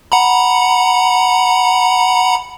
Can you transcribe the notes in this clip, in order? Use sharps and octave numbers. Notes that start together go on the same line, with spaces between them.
F#5 A#5 B5